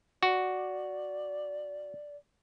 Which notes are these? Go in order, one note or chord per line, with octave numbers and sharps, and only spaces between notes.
F#4 D5